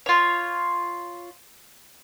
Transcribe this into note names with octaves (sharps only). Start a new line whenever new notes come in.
F4 C#5